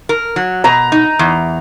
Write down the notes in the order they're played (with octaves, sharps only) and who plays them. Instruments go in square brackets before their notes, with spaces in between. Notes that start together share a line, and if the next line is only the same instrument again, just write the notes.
[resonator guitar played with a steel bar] A#4
F#3
[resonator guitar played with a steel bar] B2 [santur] A#5
[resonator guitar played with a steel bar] D#4
E2